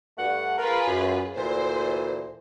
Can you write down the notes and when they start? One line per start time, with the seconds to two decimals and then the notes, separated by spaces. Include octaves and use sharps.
0.18 G2 A3 F#5
0.58 F4 G#4 A#4 B4
0.87 F#2
1.36 D2 A#2 E3 C5